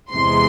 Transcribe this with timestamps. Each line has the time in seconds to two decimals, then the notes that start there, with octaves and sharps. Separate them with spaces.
0.11 E2 C3 E3 G#3 C6